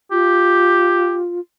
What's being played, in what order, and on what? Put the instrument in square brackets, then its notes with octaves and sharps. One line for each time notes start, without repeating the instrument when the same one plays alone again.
[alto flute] F4 [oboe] G4